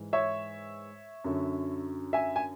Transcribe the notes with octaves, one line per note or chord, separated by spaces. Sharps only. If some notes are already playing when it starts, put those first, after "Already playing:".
Already playing: G#2 E3
C#5 E5
F#2 D3
E5 G#5
G#5